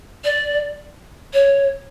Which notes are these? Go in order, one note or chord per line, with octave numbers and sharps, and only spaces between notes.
D5
C#5